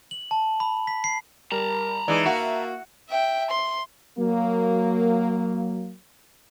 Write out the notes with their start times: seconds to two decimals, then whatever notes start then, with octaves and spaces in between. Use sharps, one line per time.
0.11 F#7
0.31 A5
0.60 B5
0.87 B6
1.04 C7
1.52 G3 A#4 A5 A#5
2.08 E3 G#3 D#4 B4 D5
2.26 A#3 F#4 E5
3.09 E5 G5
3.50 C6
4.18 F#3 A#3